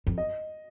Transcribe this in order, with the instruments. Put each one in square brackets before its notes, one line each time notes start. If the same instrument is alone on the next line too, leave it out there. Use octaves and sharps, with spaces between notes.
[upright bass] F2
[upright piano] D#5